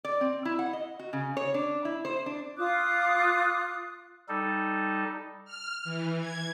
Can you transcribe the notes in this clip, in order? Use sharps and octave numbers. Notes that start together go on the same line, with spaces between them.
D5
C4
E4
F#5
D#5
F#4
C#3
C#5
D4
E4
C5
D4
F4 D6 D#6 F#6
G3 D#4 A4
F6
E3
G#6